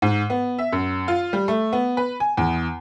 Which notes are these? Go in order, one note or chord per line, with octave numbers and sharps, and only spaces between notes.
G#2
B3
E5
F#2
F4
G3
A3
B3
B4
G#5
E2